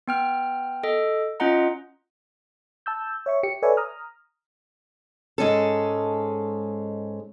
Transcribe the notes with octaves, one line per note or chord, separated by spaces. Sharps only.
B3 G5 F6
A4 D#5
C#4 F4 D#5 F#5 A#5
A5 E6 G6
C#5 E5 C#6
G4 C#7
A4 B4 C#5 D5 E5 G#5
A#5 D#6 F6
G#2 G#3 C#4 A4